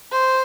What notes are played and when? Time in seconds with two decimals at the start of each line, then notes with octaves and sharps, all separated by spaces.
0.12 C5